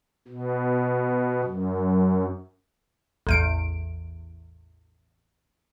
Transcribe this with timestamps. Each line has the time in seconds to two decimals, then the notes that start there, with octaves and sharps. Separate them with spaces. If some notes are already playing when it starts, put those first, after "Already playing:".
0.28 B2
1.44 F#2
3.27 A1 E2 D7